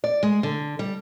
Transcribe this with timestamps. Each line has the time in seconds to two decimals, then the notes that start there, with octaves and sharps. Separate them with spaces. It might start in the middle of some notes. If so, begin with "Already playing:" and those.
0.04 D5
0.23 G#3
0.43 D3
0.79 G3